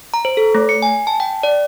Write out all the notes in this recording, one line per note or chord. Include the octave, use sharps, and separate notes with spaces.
A#5
C5
A4
A3
C#7
G#5
A5
G5
D5